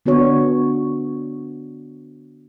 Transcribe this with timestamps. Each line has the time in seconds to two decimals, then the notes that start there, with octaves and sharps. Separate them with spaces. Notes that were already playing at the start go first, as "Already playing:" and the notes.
0.06 D3 B3 D4 F#4 C#5